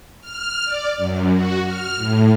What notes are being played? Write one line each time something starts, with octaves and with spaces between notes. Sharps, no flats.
F6
D5
F#2
F#4
F6
A2